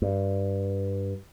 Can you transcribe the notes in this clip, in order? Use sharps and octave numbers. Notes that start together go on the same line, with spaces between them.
G2